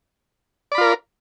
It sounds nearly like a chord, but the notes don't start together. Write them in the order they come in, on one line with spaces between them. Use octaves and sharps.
D5 B5 F4 A#4